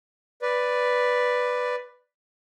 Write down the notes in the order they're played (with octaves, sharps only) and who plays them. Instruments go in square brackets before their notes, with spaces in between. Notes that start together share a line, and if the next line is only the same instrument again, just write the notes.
[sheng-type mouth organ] B4 D5